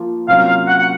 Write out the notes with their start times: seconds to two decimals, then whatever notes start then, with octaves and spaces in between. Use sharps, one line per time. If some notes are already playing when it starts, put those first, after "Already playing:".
Already playing: F3 A#3 F4
0.28 C3 F#3 A#3 C#4 F4 F5
0.47 F5
0.67 F#5
0.79 F#5